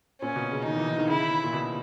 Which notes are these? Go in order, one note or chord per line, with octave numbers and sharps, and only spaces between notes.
A#2 C#4
B2
C#3
D#3 D#4
E3
E3
D#3
C#3 E4
A#2
B2